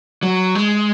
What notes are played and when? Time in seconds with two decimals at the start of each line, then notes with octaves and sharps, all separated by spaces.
0.23 F#3
0.55 G#3